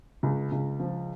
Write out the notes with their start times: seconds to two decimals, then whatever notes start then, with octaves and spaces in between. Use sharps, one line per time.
0.23 C#2
0.52 C#2
0.80 F3